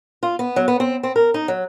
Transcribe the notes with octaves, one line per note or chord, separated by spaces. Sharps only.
F4
B3
F#3
B3
C4
C4
A#4
D#4
F#3